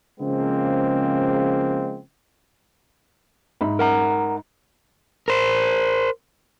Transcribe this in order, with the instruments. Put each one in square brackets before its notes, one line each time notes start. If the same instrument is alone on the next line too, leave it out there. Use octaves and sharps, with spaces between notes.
[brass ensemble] C#3 F3 G#3 A#3 C4
[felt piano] G#2 E5 B5
[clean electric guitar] A#4 F#5 A#5
[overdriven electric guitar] A#4 C5